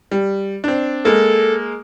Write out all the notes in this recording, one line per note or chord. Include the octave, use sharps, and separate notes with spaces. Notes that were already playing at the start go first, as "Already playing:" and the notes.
G3
C4 D4
G#3 A#3 A4